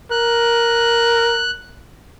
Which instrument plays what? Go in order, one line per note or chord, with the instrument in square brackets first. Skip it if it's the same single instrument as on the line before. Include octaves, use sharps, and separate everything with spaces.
[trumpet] A#4 [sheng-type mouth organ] F#6